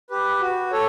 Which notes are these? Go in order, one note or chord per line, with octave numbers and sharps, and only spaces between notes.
G4 B4
F#4
A4 C#5